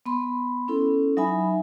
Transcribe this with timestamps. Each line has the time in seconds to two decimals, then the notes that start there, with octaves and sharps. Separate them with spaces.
0.06 B3 B5 C6
0.68 C#4 E4 A4
1.17 F#3 D#4 E5 G#5 B5